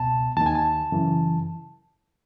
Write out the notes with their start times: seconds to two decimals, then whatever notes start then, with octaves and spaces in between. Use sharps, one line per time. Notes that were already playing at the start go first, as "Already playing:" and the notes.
Already playing: C#2 B2 A5
0.37 D#2 A5
0.41 D#3
0.46 G#5
0.55 A5
0.92 F#2 C#3 E3